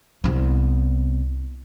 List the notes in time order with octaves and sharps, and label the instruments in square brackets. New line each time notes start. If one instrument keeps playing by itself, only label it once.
[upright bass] C2 B3